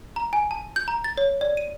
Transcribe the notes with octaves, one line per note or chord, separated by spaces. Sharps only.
A#5
G#5
A5
G6
A#5
A6
C#5
D5
D#7